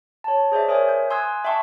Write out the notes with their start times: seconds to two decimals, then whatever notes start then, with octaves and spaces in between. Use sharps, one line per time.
0.24 C#5 A5
0.52 G#4 C5 D5 E5
0.68 A#4 C#5 E5 G#5 D#6
0.89 G6
1.10 G#5 C6 D#6 E6 F#6 G#6
1.44 E5 G5 A5 C6 C#6 E6